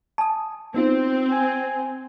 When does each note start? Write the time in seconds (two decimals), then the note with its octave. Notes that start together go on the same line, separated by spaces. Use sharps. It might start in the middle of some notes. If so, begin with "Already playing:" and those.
0.18 G#5 A5 D#6
0.74 B3 C4 D#4 F4
1.31 G#5